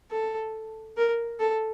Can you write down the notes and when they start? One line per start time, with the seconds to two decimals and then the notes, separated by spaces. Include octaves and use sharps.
0.11 A4
0.97 A#4
1.40 A4